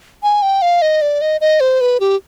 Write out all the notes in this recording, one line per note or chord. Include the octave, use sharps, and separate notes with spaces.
G#5
G5
F5
D#5
D5
D#5
D#5
C5
B4
G4